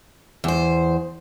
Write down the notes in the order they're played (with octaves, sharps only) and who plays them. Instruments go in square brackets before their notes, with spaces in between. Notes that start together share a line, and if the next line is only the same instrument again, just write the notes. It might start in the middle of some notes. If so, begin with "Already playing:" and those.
[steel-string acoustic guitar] E2 C5